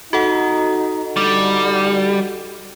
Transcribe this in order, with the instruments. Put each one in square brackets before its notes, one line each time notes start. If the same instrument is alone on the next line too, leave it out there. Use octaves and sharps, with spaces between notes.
[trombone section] D#4 [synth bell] F#4 A4 F#5
[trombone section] D3 D#4 [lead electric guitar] G3